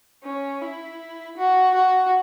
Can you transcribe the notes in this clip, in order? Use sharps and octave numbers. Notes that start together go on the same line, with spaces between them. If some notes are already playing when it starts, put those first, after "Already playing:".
C#4
E4
F#4
F#4